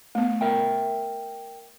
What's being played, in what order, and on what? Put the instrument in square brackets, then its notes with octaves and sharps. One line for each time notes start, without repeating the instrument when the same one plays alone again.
[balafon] A3 B3
[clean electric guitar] A#4 E5 G5